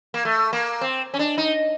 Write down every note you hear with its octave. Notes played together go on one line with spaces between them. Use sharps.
A#3
A3
A#3
C4
C#4
D4
D#4